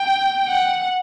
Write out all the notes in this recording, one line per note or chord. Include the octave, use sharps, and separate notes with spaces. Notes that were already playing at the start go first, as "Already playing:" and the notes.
Already playing: G5
F#5